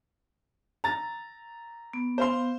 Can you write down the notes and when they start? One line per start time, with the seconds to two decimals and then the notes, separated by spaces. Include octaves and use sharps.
0.84 A#5 A6
1.93 B3
2.18 C5 F5 C6